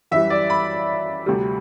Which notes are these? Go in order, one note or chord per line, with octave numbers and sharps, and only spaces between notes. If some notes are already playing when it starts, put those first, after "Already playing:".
F#2 E3 G3 E5
D5
B5
D2 C3 G3